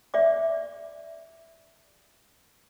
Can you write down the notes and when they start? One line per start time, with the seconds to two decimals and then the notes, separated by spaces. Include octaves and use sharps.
0.14 D5 E5 D6